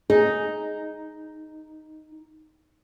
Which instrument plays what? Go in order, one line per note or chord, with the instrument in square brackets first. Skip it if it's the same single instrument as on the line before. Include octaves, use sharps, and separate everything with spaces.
[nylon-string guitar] D#4 [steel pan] G#4